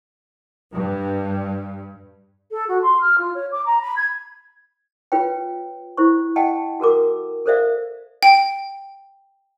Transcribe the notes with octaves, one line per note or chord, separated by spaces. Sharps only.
G2
A4
F#4
C6
F6
F4
C#5
D6
A#5
B5
G#6
F4 B4 C#5 G5
E4 C5 C#6
D#5 F#5 G5 A5
F#4 A4 A#4 D6
A4 A#4 C5 D5 E5 F5
G5